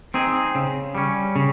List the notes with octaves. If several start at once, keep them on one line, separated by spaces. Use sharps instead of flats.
C4 D#4 G#4
C#3
G3 C#4
C#3